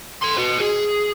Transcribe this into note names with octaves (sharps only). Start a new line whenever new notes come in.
A4 C6
F#4 B4
G#4